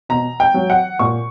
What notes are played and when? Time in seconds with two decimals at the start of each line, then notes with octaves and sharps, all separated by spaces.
0.09 B2 A#5
0.40 G5
0.54 F#3
0.70 F#5
0.99 A#2 C#6